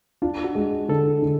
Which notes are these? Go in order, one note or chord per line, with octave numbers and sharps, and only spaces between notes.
D4 F4
F#4
G#3
D3 A4
D3